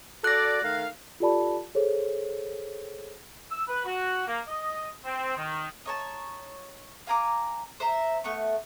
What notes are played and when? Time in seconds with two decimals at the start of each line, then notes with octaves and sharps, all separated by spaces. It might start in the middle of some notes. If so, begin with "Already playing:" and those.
0.24 F#4 A4 D5 F#6 A#6
0.63 D#3 A3 F5
1.20 F4 G4 A4 D5 A5 B5
1.75 G#4 A4 C5 C#5
3.50 E6
3.68 B4
3.85 F#4
4.26 A#3
4.47 D#5
5.05 C4
5.36 D#3
5.86 D#4 C#5 A5
7.07 F5 G#5 A#5 D6
7.80 C5 E5 A#5
8.24 A3 B3 C#6